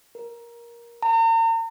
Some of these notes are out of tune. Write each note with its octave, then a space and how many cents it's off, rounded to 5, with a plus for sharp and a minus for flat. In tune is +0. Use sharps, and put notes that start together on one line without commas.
A#4 +15
A#5 -45